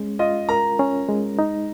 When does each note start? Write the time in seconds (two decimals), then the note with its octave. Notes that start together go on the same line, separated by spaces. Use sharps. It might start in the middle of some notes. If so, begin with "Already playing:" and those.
Already playing: G#3 C#4
0.19 F4 D#5
0.49 A#4 A#5
0.79 C#4
1.09 G#3
1.39 D#4